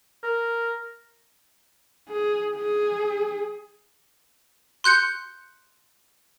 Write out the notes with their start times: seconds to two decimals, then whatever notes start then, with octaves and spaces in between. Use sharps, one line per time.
0.23 A#4
2.09 G#4
2.56 G#4
4.84 C6 F#6 G6 C#7